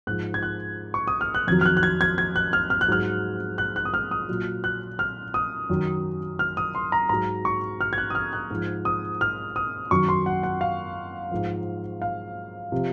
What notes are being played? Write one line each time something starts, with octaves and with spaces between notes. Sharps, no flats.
G#2 F3 F#6
G#6
F#6
C#6
D#6
F6
F#6
F2 D#3 F#3 G#6
F6
F#6
F#6
G#6
G#6
G#6
F#6
F6
F6
F#6
G#2 F#3 F6
F#6
F#6
D#6
F6
D#6
A#2 F#3
F#6
F6
D#6
F#2 D#3 F#3
F6
D#6
C6
A#5
G#2 F#3 A#5
C#6
F6
G#6
F#6
D#6
F6
F#6
G#2 F3
D#6
F6
D#6
F#2 D#3 F#3 C#6
C6
F#5
F#5
F5
G#2 F3
F5
C3 F3